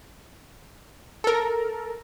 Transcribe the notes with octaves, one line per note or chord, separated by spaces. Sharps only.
A4 A#4